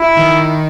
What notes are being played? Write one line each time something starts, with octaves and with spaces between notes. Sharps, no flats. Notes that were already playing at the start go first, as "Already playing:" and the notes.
Already playing: E4
D#3